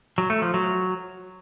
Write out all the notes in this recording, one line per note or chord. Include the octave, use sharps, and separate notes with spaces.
F#3
A3
F3
F#3